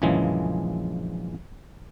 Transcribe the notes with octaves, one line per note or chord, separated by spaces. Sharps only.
A#1 F#2 C#3 E3 F3 G#3